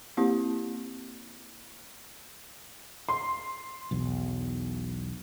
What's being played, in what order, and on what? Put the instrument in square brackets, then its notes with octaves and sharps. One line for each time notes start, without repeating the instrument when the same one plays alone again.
[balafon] A#3 C4 E4 G4
[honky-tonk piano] C6
[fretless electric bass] B1 E2